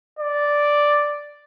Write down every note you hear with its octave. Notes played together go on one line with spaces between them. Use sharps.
D5